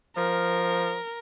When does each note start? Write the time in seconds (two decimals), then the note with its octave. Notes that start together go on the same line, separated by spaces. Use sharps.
0.17 F3 A#4